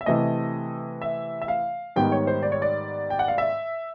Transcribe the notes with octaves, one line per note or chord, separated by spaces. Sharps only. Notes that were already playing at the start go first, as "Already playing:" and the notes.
E5
C3 E3 A3 D#5
E5
E5
F5
G#2 D#3 G3 B3 G5
C#5
C5
D5
C#5
D5
G5
F#5
F5
E5